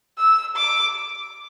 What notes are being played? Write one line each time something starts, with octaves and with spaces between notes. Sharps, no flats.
E6
D6